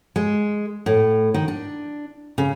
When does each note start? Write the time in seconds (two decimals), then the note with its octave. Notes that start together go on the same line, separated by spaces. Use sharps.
0.16 G#3
0.86 A2
1.34 D#3
1.48 D4
2.38 C#3